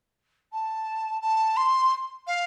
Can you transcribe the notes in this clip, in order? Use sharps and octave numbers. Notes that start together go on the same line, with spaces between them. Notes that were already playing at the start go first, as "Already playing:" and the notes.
A5
A5
C6
F5